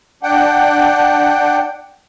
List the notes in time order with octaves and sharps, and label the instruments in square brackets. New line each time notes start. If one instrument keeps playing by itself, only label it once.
[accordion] D4 F#5 G5